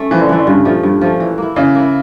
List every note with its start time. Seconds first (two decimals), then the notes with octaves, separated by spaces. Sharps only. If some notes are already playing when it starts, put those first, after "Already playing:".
Already playing: A3 C#4
0.11 E3 F3
0.21 D3
0.29 E3 E4
0.32 A3
0.38 D3
0.47 G2 C#3
0.65 A#2 F3 A3
0.83 G2
1.01 F3 A3
1.20 E3
1.38 A#3 E4
1.56 C#3 E3
1.75 A#3 E4